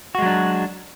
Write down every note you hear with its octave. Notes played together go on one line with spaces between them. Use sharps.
F#3 G#3 D4 F#4